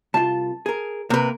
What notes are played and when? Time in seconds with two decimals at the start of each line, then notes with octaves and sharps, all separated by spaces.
0.14 C2 F4 A5
0.66 G#4 A#4
1.10 C3 A#3 A#4 B4